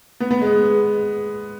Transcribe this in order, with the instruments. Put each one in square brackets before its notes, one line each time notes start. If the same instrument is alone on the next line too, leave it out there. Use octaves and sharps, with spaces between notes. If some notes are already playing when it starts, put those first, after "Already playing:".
[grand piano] B3
B3
G#3